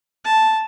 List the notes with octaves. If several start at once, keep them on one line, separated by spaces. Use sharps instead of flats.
A5